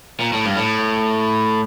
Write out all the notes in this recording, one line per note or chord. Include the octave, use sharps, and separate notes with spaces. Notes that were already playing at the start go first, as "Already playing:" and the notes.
A#2
A2
G2
A2